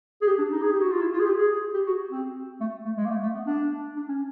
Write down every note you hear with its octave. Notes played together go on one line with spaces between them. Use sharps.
G#4
G4
D4
D#4
G#4
G4
F#4
F4
E4
F4
G#4
G4
G#4
G4
F#4
C4
A3
A3
G#3
A#3
A3
A3
B3
D4
D4
C#4